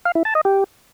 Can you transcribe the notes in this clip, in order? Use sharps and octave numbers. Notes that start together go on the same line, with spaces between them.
F5
E4
A5
D#5
G4